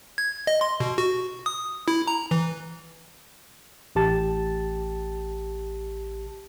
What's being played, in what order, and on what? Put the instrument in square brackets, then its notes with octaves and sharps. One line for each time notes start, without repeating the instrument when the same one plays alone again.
[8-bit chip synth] G#6
D#5
C6
B2
F#4
D#6
E4
A#5
E3
[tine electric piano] A1 G4 A5 A6